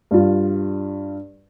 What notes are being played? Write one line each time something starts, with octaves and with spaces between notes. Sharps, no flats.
G2 F4